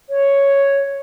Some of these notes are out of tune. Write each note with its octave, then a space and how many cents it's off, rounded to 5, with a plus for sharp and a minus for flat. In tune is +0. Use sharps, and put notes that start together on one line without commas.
C#5 +0